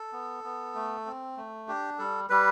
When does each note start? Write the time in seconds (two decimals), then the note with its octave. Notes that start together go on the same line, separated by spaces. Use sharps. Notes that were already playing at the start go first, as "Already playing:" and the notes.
Already playing: A4
0.13 B3
0.44 B3
0.75 A3
1.06 C4
1.37 A3
1.68 D4 G4
1.99 G3 A4
2.30 G3 B4